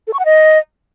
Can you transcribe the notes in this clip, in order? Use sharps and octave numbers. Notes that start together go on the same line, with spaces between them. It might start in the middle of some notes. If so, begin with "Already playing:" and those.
A4
C#6
F#5
D#5